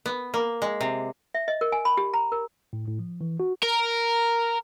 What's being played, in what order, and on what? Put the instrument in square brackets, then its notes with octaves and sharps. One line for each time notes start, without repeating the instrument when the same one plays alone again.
[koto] B3
A#3
G#3
C3
[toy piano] E5
D#5
A#4
G#5
B5
G4
A#5
A#4
[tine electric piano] A2
A2
F3
E3
F#4
[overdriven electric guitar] A#4